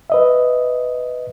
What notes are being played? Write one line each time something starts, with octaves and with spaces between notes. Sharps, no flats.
B4 D#5 E5